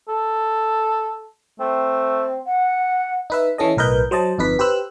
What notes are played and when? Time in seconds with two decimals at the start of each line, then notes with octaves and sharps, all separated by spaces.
0.08 A4
1.60 A3 C4
2.46 F#5
3.30 D#4 B4 E5
3.58 E3 C#4 A4 D#5
3.77 B1 A2 A#4 B4 D#5 G6
4.11 F#3 C5 D#5 A5
4.38 G1 F2 D#4 B4 B6
4.59 G4 B4 C5 E6 F#6